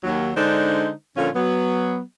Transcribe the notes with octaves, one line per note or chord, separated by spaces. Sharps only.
D#2 F#3
D3 G#3 D4 D#4 C5
A#2 D3 F3 C#4 F4
F#3 B3